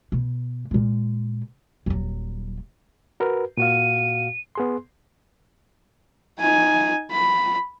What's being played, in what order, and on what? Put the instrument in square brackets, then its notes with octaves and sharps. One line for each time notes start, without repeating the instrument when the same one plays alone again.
[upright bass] B2
A#2 G#3
D#1 F#3
[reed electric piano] F#4 A#4 B4
[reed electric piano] A#2 F#4 F5 [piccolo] D#7
[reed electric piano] B3 G#4 C6
[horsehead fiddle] D#4 G#5
B5